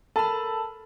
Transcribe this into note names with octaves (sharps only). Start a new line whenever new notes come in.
A4 A#4 A5 B5